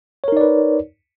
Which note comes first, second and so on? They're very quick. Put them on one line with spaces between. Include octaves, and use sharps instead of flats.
C#5 A#4 D#4 D5 B4